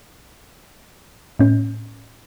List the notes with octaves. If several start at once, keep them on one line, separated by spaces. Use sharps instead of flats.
A2 C#4